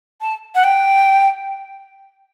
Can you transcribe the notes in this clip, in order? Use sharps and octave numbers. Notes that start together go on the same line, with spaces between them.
A5
F#5
G5